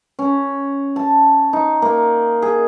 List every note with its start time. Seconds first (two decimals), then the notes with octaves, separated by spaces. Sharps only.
0.19 C#4
0.96 A5
1.53 D#4
1.82 A#3
2.42 G#4